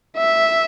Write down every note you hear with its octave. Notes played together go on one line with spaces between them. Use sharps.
E5